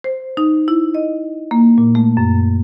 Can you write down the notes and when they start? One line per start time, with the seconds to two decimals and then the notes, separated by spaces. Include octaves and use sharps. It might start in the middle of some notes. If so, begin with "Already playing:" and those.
0.04 C5
0.37 D#4
0.68 E4
0.95 D#5
1.51 A#3
1.78 A#2
1.95 A3
2.17 F#2